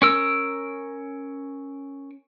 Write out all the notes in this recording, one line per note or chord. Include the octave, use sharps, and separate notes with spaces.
C#4 A#4 E6